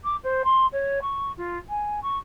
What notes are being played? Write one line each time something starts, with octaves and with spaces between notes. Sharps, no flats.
D6
C5
C6
C#5
C#6
F4
G#5
C#6